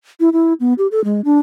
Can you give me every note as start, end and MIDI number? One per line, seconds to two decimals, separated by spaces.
0.20 0.29 64
0.33 0.53 64
0.60 0.74 59
0.78 0.87 67
0.91 1.03 69
1.04 1.21 56
1.25 1.39 62